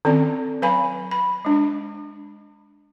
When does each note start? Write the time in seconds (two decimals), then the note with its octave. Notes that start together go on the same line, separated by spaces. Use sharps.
0.05 D#3 C4 C#4 D5
0.62 F#3 B4 F5 G#5 B5
1.11 B5
1.45 G#3 D4